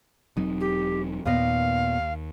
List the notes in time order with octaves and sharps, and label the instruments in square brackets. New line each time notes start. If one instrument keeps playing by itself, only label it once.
[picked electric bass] E1 F#3 C4 [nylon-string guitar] D#4
[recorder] G4
[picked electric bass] D#2 [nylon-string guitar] A#2 B3 D#5 [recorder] F5